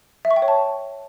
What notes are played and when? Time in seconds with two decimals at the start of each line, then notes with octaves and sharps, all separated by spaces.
0.25 E5
0.31 C#6
0.36 G5
0.42 C#5
0.48 A5